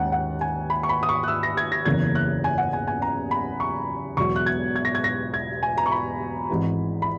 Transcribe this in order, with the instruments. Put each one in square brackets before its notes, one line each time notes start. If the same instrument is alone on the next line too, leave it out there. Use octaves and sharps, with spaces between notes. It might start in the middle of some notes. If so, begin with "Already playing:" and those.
Already playing: [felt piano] D#2 D#3 G#3 C#4 F#5
F#5
G#5
B5
C#6
B5
D#6
C#6
F#6
E6
A#6
G#6
A#6
F#1 E2 C#3 E3 A#3 G#6
F#6
G#5
F#5
G#5
G#5
A#5
B5
C#6
E1 E2 B2 F#3 C#6
F#6
G#6
G#6
A#6
G#6
A#6
G#6
G#5
A#5
C#6
B5
G#1 G#2 E3
B5